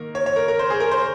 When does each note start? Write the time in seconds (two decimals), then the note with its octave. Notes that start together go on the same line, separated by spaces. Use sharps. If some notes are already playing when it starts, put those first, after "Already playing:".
Already playing: D#3 A#3 A#4
0.15 C#5
0.26 C#5
0.36 A#4
0.48 A#4
0.59 C5
0.70 G#4
0.80 A#4
0.91 C5